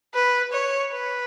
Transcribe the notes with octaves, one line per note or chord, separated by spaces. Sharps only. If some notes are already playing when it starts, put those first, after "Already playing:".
B4
C#5
B4